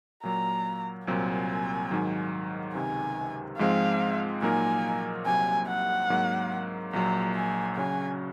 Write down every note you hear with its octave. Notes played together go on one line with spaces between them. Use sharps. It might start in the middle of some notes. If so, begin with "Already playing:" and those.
A#2 F#3 A#3 A#5
C2 A#2 F#3 C4 G#5
G#2 D#3 F#3
C#2 C3 D#3 G#5
G#2 F3 G#3 C4 F5
A#2 F#3 A#3 D#4 A#4 G#5
C2 C3 F#3 C4 G#5
F#5
G#2 F#3 A#3
A#1 A#2 F#3 A#5
G#5
C#3 F#3 C#4 F#4 G#5